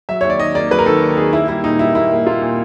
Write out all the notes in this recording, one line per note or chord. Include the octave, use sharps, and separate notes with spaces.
F#3 E5
D#2 C#5
D5
D#3 D#5
A#3 D5
F#3 B4
A#4
D#3 A4
D#2
D#3 G#4
A#3 E4
G3 E4
A#2 D#4
G3 E4
A#3 E4
A#3
A#3 F4
A#2